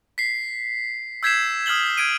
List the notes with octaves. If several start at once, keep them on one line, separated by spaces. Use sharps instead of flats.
B6 C7
E6 G6 G#6 B6 C7 E7
D#6 F6 G#6 F#7 G7
F6 G#6 D7 D#7